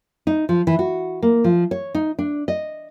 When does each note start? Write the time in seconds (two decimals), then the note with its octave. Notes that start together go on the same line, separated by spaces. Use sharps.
0.27 D#4
0.49 F3
0.67 E3
0.79 F#4
1.22 A#3
1.44 F3
1.71 C#5
1.95 D#4
2.19 D4
2.48 D#5